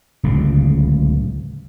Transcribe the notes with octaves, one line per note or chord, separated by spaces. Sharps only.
D1 C#2 C#3